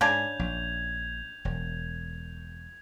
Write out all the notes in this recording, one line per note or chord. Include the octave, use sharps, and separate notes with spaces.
G#2 C#3 D4 G#5 G6 G#6 F7
A#1
E1